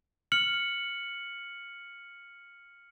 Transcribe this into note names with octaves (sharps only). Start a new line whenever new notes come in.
F6 C#7 F#7